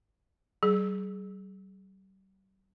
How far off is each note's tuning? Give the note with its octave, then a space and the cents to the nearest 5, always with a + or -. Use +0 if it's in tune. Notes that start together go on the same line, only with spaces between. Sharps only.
G3 -40 G#4 +15